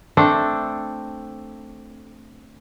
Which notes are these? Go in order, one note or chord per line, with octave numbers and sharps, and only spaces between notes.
A3 C4 D4 A4